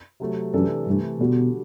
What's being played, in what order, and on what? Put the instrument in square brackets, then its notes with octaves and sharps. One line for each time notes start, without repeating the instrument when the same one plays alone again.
[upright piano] C3 F#3 A3
[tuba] F#2 [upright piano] C3 E3 A3 D4 A4
[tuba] G2 [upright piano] C3 E3 A3
[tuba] B2 [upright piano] D3 G3 D4 F#4 A4